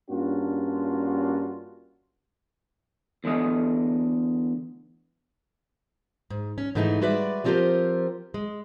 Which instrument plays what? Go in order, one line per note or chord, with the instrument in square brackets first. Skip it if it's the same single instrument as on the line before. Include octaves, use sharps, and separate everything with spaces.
[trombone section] G2 A#3 C#4 D4 F4 F#4
[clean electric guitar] E2 D3 A3 D#5
[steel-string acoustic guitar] G#2
C#4
G#2 E3 A3 D#4 G#4
G3 G#3 F#4 B4 D5 E5
F3 C4 F4 G4 A#4 C5
G#3